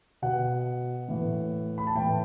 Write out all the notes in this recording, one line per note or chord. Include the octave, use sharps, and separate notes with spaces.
B2 F#5
A2 E3
B5
A5
A2 E3 G5